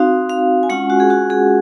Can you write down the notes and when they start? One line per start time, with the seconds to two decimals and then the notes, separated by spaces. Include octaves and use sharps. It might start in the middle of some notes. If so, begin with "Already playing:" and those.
Already playing: C4 D#4 F#4 F5
0.30 F5
0.63 G#5
0.70 G#3 C#4 F4 F#5
0.90 F#4
1.00 G#4
1.10 F#4
1.30 G#4